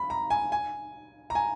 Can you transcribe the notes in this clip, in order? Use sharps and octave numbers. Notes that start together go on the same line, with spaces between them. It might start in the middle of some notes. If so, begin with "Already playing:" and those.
Already playing: B5
A#5
G#5
G#5
A#5
G#5